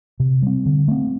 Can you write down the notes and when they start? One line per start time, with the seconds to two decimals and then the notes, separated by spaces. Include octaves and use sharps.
0.20 C3
0.42 G3 C4
0.66 D3
0.88 A3 C4